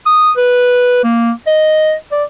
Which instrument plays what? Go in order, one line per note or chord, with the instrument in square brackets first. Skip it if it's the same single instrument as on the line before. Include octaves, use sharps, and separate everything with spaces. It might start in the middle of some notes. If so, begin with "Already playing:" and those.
[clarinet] D#6
B4
A#3
D#5
D5